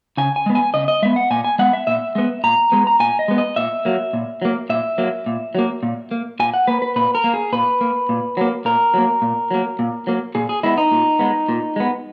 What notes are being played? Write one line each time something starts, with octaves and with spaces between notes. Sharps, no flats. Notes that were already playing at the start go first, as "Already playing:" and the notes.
C#3 G#5
G#5
G#3 B3
G#5
C#3 D#5
D#5
G#3 B3 E5
F#5
A#2 G#5
G#5
G#3 B3 F#5
E5
A#2 E5
G#3 B3
A#2 A#5
G#3 B3
A#5
A#2 G#5
D#5
G#3 B3
D#5
A#2 E5
F#3 A#3
A#2
F#3 A#3
A#2 E5
F#3 A#3
A#2
F#3 A#3
A#2
A#3
A#2 G#5
F#5
A#3 B4
B4
A#2 B4
A#4
A#3
G#4
A#2 B4
A#3
A#2
F#3 A#3
A#2 A#4
F#3 A#3
A#2
F#3 A#3
A#2
F#3 A#3
A#2 G#4
G#4
G#3 B3 E4
D#4
A#2
G#3 B3
A#2
G#3 B3